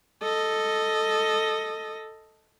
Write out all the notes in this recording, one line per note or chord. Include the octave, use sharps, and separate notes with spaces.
A4 D#5